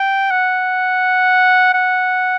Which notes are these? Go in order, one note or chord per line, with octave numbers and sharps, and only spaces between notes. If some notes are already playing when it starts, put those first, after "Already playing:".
Already playing: G5
F#5
F#5